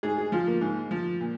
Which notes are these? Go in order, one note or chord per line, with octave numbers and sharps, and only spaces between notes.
G#2 G#4
G#4
F3 F4
A#3
G#2
F3
A#2